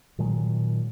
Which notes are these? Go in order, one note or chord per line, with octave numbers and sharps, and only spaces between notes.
A#2 D#3 F#3 G#3